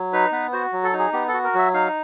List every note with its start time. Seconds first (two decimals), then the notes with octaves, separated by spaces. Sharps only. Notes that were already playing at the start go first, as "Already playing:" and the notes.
Already playing: F#3
0.13 D#4 B4
0.32 B3 B4
0.53 F#4 C5
0.73 F#3
0.83 A4
0.93 D#4
0.99 G#4
1.13 B3 G4
1.28 A4
1.34 F#4
1.44 A#4
1.54 F#3 E5
1.74 D#4 F5